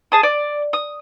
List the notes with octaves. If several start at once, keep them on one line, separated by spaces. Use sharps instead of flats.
G#4 A5 D#6
D5
D#6